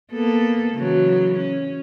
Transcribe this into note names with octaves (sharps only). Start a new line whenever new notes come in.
A#3 B3 A4
C#3 E3 F#3
C#4